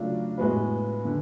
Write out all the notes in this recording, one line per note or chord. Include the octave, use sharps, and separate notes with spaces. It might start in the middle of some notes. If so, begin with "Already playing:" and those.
Already playing: C#3 F#3 A3 D4 F4
A2 G#3 B3 F#4 B4
D3